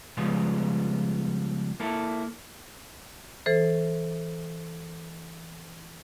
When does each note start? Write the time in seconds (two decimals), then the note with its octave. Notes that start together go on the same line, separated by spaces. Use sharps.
0.17 C#3 F3 G3 G#3 B3
1.80 A#3 E4 A4
3.46 E3 A4 C5